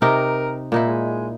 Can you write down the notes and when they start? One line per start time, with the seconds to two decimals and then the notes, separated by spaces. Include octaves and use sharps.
0.02 C3 D#4 G4 A#4
0.72 A#2 D#4 E4
0.86 G#3